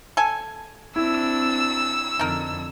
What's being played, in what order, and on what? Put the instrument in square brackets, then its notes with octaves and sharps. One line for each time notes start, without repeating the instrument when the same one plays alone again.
[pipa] A4 G#5
[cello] C4 D4 [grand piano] E4 [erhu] E6
[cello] F2 D3 [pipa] D#4 A#4